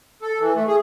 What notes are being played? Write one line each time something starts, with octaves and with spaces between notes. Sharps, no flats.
A4
E3
A3
G#4